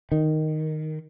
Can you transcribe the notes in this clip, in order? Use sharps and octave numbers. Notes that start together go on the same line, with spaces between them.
D#3